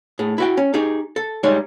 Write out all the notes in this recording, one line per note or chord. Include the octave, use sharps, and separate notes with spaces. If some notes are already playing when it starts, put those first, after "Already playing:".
A2 G#4
E4 F#4 G5
C#4
D#4 G4 G#4
A4
G3 G#3 D#4 C#5